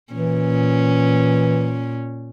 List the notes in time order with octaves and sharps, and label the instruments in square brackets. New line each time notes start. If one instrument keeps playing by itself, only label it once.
[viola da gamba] A#2 C#4 [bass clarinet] E3